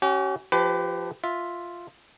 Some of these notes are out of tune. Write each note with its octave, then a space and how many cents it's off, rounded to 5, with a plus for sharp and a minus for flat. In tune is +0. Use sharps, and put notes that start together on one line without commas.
C#4 +0 G4 -45
F3 +0 G4 +0 B4 +30
F4 +0 E5 +0